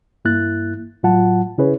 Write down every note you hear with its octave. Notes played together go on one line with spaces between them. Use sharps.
G2 A#3 E4 F#6 A6
A2 F#3 F4 F#5 A5
C#3 C#4 E4 G#4 B4 C#5